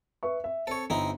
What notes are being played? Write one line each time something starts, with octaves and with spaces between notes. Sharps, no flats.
B4 E5 C#6
E5
C4 A4 C#5
G1 C4 D#4 E4